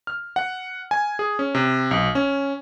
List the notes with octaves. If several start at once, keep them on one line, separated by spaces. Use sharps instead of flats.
F6
F#5
G#5
G#4
C#4
C3
B1
C#4